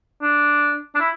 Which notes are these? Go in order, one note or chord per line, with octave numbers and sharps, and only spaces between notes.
D4
D4
E4